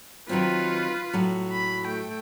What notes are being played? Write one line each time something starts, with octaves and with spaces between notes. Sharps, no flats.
D#3 F#3 C4 F4 B4
A2 F#3
B5
A3 G5